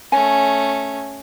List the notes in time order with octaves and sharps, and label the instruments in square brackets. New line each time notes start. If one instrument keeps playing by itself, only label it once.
[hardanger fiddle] A3 C#4 [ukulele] G#5